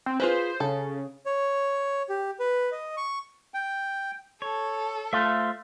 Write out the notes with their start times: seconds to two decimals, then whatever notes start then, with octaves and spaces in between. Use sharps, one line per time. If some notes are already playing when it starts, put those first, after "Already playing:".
0.06 C4
0.20 F4 G#4 B4 C5
0.60 C#3 A4
1.26 C#5
2.09 G4
2.40 B4
2.72 D#5
2.97 C#6
3.54 G5
4.42 A4 C#5
5.13 A3 F4 C5 E5